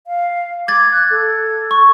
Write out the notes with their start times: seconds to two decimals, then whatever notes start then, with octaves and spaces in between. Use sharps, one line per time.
0.07 F5
0.68 D6 G#6 A6
0.92 F#6
1.11 A4
1.71 C#6